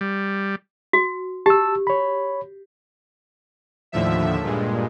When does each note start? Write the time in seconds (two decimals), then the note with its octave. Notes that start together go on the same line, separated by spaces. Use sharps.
0.01 G3
0.93 F#4
1.46 G4 A5 E6
1.87 C#5 B5
3.92 D#2 A2 D3 F3 E5
4.42 G2 A#2 G#3